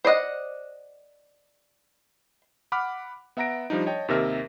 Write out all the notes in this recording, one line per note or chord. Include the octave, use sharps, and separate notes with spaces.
C5 D5 D#5 F#5
F#5 B5 D6 F6
B3 E5 F#5 A#5 A#6 D7
F3 G3 D4 D#4
C#5 D#5 G5 A5
D#2 C3 D#4 A#4 E5 F6